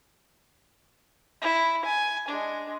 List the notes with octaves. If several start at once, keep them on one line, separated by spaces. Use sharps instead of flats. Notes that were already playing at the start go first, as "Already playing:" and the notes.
E4
G#5
G#3 D4